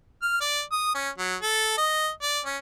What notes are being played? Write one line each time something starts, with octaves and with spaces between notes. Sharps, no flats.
F6
D5
D#6
C#4
F#3
A4
D#5
D5
C#4